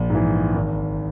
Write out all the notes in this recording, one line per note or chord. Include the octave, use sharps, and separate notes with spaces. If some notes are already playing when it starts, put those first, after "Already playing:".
Already playing: A#1
G#2 E3
G#1